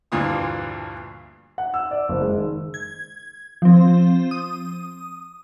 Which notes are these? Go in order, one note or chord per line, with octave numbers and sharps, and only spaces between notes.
D2 G2 A#2 E3 F4 D#6
F#5
E6
D5
F#1
G#3
D#3
G#6
F3 C4
D#6